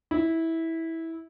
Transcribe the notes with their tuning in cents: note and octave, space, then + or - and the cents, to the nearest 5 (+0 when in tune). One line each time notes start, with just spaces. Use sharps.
E4 -15